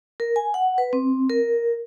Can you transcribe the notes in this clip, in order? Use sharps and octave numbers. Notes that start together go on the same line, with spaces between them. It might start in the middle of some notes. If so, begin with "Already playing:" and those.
A#4
G#5
F#5
B4
C4
A#4